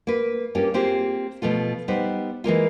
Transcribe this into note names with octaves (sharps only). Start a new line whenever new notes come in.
A#3 B4
G2 A#3 C#4 F4 G4
A#3 C4 F4 G4 G#4 C5
B2 F3 A3 F4
G3 B3 D#4 B4 C5
E3 G#3 A#3 F4